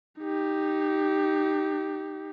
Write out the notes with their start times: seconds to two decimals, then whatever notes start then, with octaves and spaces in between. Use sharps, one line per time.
0.20 D#4 G4